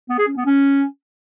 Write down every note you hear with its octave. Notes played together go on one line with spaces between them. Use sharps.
B3
G#4
C#4
B3
C#4